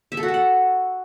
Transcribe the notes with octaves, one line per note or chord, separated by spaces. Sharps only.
E5
A4
F#4
A4
F#5